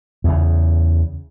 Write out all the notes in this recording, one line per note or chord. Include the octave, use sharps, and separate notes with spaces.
E2 C#3